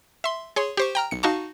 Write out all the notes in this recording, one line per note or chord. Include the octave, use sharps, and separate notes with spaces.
E5 C6
G#4 C#5 C6
G4 C5 C#6
G5 A#5 F6
B1 C#7
D#4 F#4 F5 A5 C#6